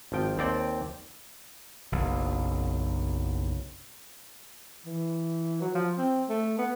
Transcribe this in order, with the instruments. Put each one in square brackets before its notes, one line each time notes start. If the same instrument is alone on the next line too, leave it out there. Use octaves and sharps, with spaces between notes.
[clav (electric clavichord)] G#1 F3 G5
D#2 C4 D5 G5
[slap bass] F#1 B1
[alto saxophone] E3
F#3
F3
C4
A3
B3